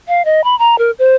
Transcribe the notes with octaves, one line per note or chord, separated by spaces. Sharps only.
F5
D#5
B5
A#5
A#4
C5